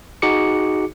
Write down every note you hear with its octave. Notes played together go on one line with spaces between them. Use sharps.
D#4 F#4 G#4 D6 C#7